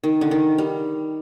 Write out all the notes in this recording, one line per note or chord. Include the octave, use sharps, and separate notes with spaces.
D#3
D3
D#3
G3